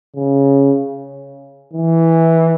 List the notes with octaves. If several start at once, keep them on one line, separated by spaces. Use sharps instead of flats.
C#3
E3